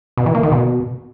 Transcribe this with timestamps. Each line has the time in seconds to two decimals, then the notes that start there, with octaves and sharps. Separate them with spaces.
0.17 B2
0.26 E3
0.35 A#3
0.43 D#3
0.52 B2